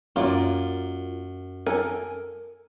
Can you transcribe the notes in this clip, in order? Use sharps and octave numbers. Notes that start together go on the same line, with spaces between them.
F#2 A#3 F4 D5
A4 A#4 G#5